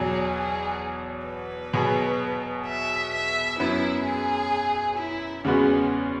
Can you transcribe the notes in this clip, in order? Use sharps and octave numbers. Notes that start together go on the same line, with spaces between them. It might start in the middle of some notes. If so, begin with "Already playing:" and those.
Already playing: E2 B2 F#3 G#4
G#4
B4
B2 F#3 B3 G#4
E5
E5
F#2 F#3 B3 E4
G#4
E4
E2 C#3 G#3 B3 C#4 F#4